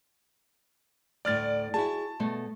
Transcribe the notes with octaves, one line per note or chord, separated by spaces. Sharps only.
D2 A2 D5 F6 A6
E4 F#4 G#4 A5
B2 A3